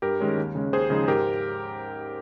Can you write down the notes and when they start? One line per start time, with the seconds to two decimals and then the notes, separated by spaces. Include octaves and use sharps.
0.02 G2 G4 A#4
0.20 D#3 G#3 C#4
0.37 D#2
0.55 C#3 G#3 C#4
0.73 D#2 G#4 C5
0.90 C#3 F3 G#3 D#4
1.08 G#2 G4 A#4